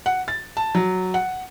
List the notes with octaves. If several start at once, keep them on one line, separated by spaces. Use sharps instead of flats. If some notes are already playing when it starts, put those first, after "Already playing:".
F#5
A6
A5
F#3
F#5